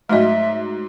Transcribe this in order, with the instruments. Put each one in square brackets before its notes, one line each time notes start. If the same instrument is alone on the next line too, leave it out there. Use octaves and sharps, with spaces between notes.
[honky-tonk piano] G#2 F#3 [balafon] A3 D#5 [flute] E5